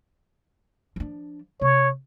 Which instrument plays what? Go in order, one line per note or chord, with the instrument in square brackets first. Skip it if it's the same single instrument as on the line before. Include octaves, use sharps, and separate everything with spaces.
[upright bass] F3 D4
[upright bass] C3 [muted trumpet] C#5